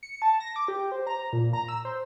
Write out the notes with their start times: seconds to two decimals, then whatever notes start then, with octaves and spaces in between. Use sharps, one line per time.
0.03 C#7
0.22 A5
0.40 A#6
0.56 D6
0.68 G4
0.92 C5
1.07 A#5
1.33 A#2
1.53 A#5
1.69 E6
1.85 C5